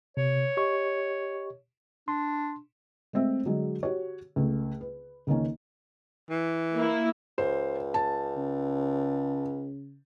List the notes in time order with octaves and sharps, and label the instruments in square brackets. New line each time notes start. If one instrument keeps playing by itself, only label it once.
[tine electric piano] C3 [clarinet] C#5
[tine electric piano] G4 D#5 C#6
[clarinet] D4 [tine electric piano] C6
[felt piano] G#3 A3 C4 E5
D3 F#3 G#3 G#4
F#4 G4 C#5
C#2 A3
B4
C#2 D#3 A#3 C#4
[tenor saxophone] E3
[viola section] A#3 E4
[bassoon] C#2 [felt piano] C5
[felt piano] A5
[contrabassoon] C#3